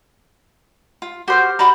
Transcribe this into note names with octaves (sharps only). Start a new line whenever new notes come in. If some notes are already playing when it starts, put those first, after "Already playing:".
F4
F#4 G4 C5 F6
F#4 D5 A#5 B5